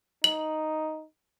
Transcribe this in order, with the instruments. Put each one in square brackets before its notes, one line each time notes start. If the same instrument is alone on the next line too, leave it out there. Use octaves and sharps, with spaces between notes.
[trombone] D#4 [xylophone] F#7